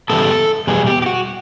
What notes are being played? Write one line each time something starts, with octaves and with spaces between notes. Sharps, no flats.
C#3 E3 G3 B3 A4
E2 B2 G3 G#4
G4
G4
F#4